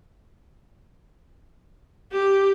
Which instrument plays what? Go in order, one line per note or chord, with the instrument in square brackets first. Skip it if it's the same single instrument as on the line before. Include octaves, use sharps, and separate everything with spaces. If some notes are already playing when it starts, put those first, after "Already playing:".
[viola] G4